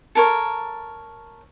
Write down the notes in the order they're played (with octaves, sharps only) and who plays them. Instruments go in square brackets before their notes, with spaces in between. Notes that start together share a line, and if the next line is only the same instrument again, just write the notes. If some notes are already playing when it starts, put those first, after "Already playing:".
[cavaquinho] A4 A#4 C#5